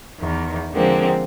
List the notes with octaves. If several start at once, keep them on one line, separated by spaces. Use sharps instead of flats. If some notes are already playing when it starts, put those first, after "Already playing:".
E2 D#3
D3 F3 G#3 A#3 C4